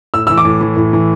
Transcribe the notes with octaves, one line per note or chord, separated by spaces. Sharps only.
A2 E6
E3 E6
D6
A2
E3
A2
E3